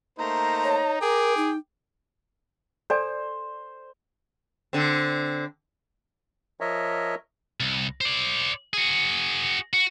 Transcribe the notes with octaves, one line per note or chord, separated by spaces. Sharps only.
A3 A#3 D#4 C5 A#5
C#5
G#4 A#4 G5 D6
D#4
A4 C5 D5 G#5
D3 C4
F3 A#4 C#5 D#5 E5
C2
C5 D5
F#4 G#4
F#4